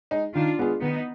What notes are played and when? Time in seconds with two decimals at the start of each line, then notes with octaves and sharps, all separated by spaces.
0.11 G#3 D#4 G#4
0.34 D#3 D4 F4
0.59 G#3 B3 F4 G#4
0.81 D#3 B3 D#4